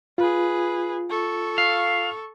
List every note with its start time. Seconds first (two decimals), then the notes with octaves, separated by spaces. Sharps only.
0.18 F4 G#4 B4
1.10 A4 C#6
1.58 F5